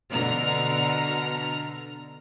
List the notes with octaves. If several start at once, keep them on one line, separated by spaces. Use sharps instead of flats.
B2 D3 A#5 F6